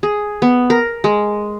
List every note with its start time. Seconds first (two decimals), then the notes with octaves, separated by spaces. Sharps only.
0.03 G#4
0.42 B3
0.70 A#4
1.04 G#3